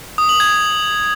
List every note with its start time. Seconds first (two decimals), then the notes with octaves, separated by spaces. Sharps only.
0.18 D#6
0.29 F#7
0.40 G#6